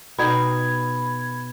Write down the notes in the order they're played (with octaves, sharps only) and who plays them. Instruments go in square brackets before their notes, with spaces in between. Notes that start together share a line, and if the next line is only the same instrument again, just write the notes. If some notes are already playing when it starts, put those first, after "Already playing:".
[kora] B2 D#4 G5 [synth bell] B5 G#6